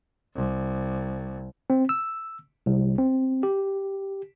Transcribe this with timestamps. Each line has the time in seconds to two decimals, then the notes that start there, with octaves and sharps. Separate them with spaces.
0.35 C2
1.70 C4
1.89 E6
2.66 C2
2.98 C4
3.43 G4